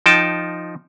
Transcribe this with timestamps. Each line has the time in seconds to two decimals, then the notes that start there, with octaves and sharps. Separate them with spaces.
0.06 F3 D#4 G5 A5